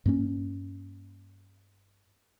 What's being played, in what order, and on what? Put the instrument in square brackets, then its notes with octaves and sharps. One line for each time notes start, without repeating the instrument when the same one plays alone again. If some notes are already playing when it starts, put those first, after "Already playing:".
[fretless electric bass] G2 A#3 C#4